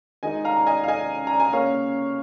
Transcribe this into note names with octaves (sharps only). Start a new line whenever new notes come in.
D#3 G#3 D#4 D#5 G#5
F5 A#5
A#5
D#5 G#5
F5
D#5 G#5
A#5
G#5
C#3 A#3 C#4 C#5 F5